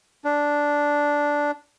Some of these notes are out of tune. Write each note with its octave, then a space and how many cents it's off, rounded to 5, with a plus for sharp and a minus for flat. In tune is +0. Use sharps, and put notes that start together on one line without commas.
D4 -5